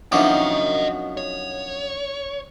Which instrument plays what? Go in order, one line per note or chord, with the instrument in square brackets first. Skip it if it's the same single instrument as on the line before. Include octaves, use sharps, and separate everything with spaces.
[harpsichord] F#2 B2 F3 [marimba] D4 D#4 E5 [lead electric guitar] D#5 G5
[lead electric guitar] C#5